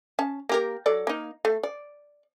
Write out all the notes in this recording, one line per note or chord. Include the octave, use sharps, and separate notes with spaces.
C#4 A5
A#3 G4 A#4
F#3 A4 D5
A#3 D#4
A3
D5